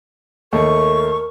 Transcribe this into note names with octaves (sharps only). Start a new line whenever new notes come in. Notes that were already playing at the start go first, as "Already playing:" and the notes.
D#2 A3 A#4 C#6